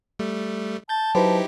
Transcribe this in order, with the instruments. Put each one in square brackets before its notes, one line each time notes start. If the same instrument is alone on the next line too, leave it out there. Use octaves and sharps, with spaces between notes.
[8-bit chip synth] G3 A3
[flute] A5 [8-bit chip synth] G6 A6
[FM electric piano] F#3 B4 C5 [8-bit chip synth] D#4 E4 G4